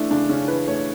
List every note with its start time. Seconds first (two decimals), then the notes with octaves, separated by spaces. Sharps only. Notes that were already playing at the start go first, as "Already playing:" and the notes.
Already playing: E3 A3 D4
0.10 C#3 D4
0.29 C#3 C#4
0.48 E3 B4
0.67 A3 C#5